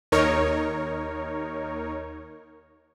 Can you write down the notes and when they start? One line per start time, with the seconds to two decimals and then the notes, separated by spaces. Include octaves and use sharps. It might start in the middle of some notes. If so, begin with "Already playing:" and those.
0.12 D#2 D#4 A#4 C#5